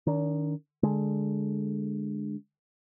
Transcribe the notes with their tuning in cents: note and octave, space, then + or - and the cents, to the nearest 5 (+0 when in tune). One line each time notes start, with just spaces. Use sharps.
D#3 +0 D4 -40
D3 +0 G#3 +0